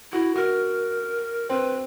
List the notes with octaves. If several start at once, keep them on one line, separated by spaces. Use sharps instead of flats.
E4 F#4
F#4 A#4
C4 B4